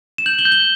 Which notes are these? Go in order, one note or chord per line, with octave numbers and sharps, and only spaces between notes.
E7
G6 F#7
G7
G6
G7